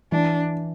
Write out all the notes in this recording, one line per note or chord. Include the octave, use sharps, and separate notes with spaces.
E3 D4